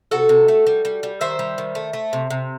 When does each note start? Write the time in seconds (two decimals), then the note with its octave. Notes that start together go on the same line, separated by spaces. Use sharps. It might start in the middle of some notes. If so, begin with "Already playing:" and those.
0.11 C3 F#4 A4
0.29 C3
0.48 A3
0.67 G3
0.85 G3
1.03 G3
1.21 D#3 C5 E5
1.39 G3
1.58 D#3
1.75 A3
1.93 A3
2.13 C3
2.30 C3